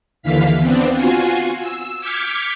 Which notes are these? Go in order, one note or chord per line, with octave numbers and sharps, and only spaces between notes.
D#2 D3 E3 F5 B6
B3 C4 D4
F4 F#4 G#5 C7
E6
D6 F6 G6 G#6 B6 C#7